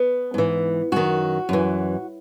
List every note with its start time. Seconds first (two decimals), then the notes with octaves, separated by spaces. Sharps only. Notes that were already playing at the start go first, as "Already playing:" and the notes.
Already playing: B3
0.34 G#2 E3
0.92 F#2 D#3 F#4
1.49 F#2 E3